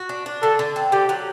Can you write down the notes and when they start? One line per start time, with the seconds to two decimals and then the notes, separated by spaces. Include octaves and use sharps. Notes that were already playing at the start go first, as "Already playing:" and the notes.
Already playing: F#4
0.09 D4
0.26 D4
0.42 D3 A4
0.59 D3
0.76 C4
0.92 D3 G4
1.09 F#3